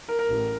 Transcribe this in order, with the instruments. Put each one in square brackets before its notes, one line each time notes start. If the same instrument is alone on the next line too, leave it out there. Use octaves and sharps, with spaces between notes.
[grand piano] A#4
A#4
[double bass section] A1